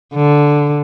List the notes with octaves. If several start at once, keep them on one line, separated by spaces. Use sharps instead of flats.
D3